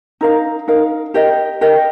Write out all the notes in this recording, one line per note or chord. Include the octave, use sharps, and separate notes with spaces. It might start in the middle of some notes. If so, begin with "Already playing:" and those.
D#4 A#4 F5
D#4 A#4 F5
G4 A#4 D#5
G4 A#4 D#5